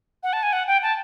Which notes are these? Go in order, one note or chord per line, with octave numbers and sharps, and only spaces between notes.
F#5
A5
G#5
F#5
G5
A5